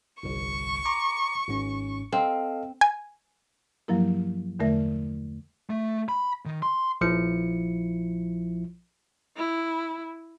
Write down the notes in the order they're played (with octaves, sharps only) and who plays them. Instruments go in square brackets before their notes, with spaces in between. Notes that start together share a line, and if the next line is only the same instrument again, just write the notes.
[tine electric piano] G1 C2 [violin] C#6
[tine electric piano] A#5 C6 D6
G#1 G#2 C#4
[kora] C4 [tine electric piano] A4 D#5 F5
[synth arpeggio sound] G#5
[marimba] G2 F3 F#3 A#3 E4 A#4
E2 D3 A3 A#4 E5
[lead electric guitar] A3
B5
D#3
C6
[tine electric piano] A#1 F3 E4 C#7
[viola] E4